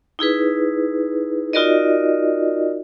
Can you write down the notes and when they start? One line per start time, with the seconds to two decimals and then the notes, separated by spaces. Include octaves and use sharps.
0.19 D#4 E4 G#4 B4
1.53 D#4 F4 F#4 A#4 D5 D#5